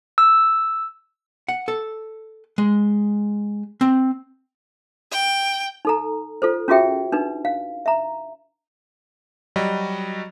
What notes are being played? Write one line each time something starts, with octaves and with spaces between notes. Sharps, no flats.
E6
F#5
A4
G#3
C4
G5
D#4 A4 A#5
F4 A4 C5
C#4 F4 F#4 G#4 E5 G5
D4 D#4 B4
F5
E5 A#5
F#3 G3 F#4 D#5